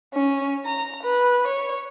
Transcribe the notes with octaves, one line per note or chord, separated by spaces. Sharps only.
C#4
A#5
B4
C#5